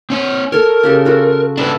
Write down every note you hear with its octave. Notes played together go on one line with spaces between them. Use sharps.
C4 C#5
A4 A#4 C#5
C#3 G4 A4
F4 F#4 A4
D4 E4 B4 A5